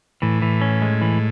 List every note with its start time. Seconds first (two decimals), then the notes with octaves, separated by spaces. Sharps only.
0.22 A2 E3
0.42 E3
0.61 C#4
0.82 G#3
1.01 E3